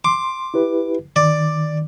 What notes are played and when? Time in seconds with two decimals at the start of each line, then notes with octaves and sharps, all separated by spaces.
0.04 C6 D6
0.54 E4 G4 B4
1.16 D#3 D5